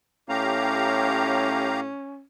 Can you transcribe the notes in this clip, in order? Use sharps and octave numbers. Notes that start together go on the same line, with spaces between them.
A2 C#4 G4 F5 A#5